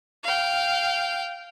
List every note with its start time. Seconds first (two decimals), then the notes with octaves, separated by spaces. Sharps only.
0.23 F5 G5